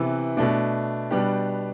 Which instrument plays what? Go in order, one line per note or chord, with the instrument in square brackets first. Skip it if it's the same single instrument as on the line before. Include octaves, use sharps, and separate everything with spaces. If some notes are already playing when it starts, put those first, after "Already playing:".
Already playing: [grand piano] C3 E3 B3
B2 A3 D4
B2 G3 B3 D4 G4